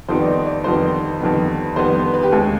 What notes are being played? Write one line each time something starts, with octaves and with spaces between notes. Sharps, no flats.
F2 D#3 G3 B3 C5
D5
D#5
D5
F2 D#3 G3 B3 C5
F2 D#3 G3 B3
F2 D#3 G3 B3 C5
B4
B4
G4
D#2 D3 G#3 G#4